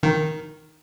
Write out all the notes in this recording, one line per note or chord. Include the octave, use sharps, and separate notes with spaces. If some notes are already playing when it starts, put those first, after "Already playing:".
D#3